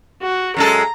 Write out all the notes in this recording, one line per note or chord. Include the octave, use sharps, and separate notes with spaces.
F#4
F#2 G#3 A4 A#5